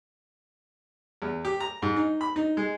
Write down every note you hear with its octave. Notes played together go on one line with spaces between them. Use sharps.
E2
G4
A#5
G#2
D#4
B5
D#4
G#3